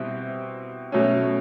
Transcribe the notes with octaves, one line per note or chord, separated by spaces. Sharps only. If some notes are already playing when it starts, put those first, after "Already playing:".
Already playing: B2 G3 C4 E4 G4
B2 F#3 A3 C#4